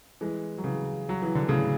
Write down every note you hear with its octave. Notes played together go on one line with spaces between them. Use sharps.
E3 G#3
F#3
C#3 E3
F#3
E3
D3
A2 C#3